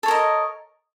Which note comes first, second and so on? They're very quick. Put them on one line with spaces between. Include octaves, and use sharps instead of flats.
A4 C#5 A#4 D#5